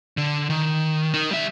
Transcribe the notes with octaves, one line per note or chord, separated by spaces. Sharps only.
D3
D#3
D#4 A#4
G3 E5